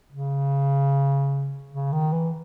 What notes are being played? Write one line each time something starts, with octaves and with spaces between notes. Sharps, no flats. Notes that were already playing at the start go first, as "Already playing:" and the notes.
C#3
C#3
D#3
E3